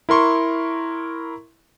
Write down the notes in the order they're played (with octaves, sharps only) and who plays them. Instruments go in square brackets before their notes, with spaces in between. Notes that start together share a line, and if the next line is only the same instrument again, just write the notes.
[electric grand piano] E4 A#4 C6 C#6